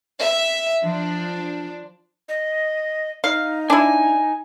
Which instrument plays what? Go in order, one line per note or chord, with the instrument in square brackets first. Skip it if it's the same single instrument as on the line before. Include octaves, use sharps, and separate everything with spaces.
[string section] E5
F3 D4
[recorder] D#5
[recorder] D#4 [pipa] F5
[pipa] D4 E4 [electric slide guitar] G#5